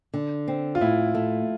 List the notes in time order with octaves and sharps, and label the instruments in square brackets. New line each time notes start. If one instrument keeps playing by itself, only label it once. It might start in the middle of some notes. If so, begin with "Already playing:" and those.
[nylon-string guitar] D3
C4
[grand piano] F4
[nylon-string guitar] A2 [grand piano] E4
[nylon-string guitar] A3